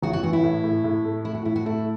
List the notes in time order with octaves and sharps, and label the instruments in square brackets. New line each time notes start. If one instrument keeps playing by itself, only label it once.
[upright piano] A1 [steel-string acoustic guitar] F#4
[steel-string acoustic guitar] F#4
[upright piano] E3 [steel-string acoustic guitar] F#4
[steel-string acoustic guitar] E4
[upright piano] A2
A2
A2
A3
[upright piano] A3 [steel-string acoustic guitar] E4
[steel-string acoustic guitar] F#4
[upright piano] A2 [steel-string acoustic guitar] E4
[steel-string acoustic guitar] F#4
[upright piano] A3 [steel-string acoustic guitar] E4